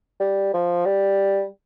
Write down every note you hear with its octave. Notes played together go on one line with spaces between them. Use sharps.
G3
F3
G3